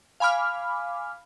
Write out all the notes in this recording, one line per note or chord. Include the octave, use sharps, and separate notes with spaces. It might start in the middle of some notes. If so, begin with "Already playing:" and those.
F5 G#5 B5 D6 F6